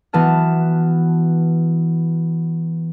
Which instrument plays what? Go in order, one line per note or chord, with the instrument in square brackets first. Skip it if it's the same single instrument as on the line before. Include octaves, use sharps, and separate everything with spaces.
[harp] E3 B3 F#4 A5 F6